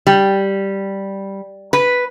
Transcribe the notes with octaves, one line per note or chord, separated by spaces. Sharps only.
G3
B4